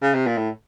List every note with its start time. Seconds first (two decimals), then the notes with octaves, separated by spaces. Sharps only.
0.02 C#3
0.15 C3
0.26 A#2
0.38 A2